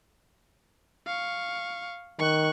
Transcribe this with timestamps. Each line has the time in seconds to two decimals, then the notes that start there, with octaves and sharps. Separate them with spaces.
1.06 F5 C#6
2.19 D#3 C#6 F#6